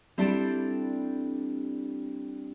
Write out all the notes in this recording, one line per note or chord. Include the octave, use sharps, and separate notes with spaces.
G3 C4 D4 E4 G4 A4